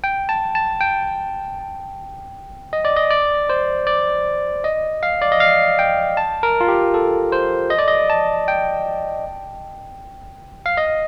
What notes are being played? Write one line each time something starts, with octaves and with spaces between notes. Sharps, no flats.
G5
A5
A5
G5
D#5
D5
D#5
D5
C5
D5
D#5
F5
D5
D#5
F5
G5
A5
A#4
F4
G4
A4
C5
D#5
D5
D#5
A5
G5
F5
D#5